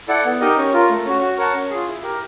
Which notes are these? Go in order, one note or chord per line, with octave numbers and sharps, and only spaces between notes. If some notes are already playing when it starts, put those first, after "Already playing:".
E4 A4 D5 F#5
B3
D#4 G4 A#4 D#5
C#4
F4 A#4
A3
C#4 F#4
F#4
A#4 C#5 F#5 A5
C#4
F4 G#4
E4
G4 A#4